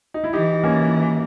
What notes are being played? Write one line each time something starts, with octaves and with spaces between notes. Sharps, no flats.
D#4
E4
E3 D#4 G4
D#4
A#3 C#4